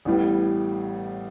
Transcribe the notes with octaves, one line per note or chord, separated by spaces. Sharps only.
A1 A2 G3 B3